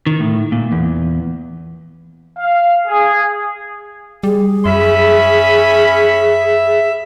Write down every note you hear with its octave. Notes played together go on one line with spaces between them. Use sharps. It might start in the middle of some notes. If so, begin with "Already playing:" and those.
D#3
A2
A#2
E2
F5
G#4
G3 G#4
F#2 C#4 E5 B5